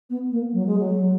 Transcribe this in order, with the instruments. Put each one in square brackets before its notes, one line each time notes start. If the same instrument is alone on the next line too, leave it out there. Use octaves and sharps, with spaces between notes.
[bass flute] B3
A#3
F#3
G#3
F#3